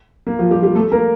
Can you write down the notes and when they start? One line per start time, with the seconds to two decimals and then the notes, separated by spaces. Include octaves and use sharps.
0.27 A#3
0.39 F3 F4
0.51 G3 G4
0.63 G3 G4
0.75 A3 A4
0.92 A#3 A#4